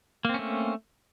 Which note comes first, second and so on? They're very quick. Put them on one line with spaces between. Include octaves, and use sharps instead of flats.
A#3 C4 C#4 A3